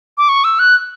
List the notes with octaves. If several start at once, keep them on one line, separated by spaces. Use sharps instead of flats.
D6
C#6
E6
F#6